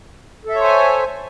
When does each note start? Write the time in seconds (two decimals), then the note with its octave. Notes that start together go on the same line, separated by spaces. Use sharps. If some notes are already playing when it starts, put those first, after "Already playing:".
0.45 A4
0.50 E5
0.55 C#5
0.59 C5
0.64 G#5